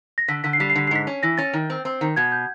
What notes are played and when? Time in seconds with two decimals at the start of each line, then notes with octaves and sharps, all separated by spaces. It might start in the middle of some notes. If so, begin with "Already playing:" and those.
0.18 A#6
0.28 D3 B6
0.44 D3 B6
0.53 C7
0.60 G3 B6
0.70 C7
0.75 D3 B6
0.87 C7
0.91 G#2 B6
1.07 C#4
1.23 E3 A#6
1.38 C#4 A6
1.53 D#3
1.70 C4
1.85 C4
2.01 D#3
2.16 B2 G#6
2.32 G6